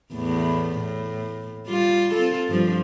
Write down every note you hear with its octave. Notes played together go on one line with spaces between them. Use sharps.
E2 A2 B3
A2
G3 F4
C4 F4 A4
G2 F3 G3